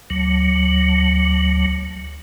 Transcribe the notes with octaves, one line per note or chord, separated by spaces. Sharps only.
D2 F#3